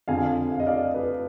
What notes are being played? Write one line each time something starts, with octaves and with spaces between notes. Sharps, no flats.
F2 D3 F5 G#5
F5
D#5
D5 F5
B4